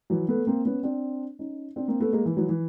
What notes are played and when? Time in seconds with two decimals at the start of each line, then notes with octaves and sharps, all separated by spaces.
0.10 E3 F#3
0.28 A3 B3
0.47 A#3 C4
0.65 B3 C#4
0.83 C4 D4
1.39 C#4 D#4
1.76 C4 D4
1.88 A#3 C4
2.00 A3 B3
2.13 G#3 A#3
2.26 E3
2.37 E3 F#3
2.49 E3